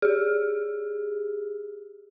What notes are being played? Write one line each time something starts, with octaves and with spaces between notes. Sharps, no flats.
G4 G#4